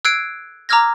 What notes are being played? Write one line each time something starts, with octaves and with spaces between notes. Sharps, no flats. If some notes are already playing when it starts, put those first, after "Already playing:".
E6 F#6 G#6 C7 D7
A#5 D6 E6 F6 G#6 A#6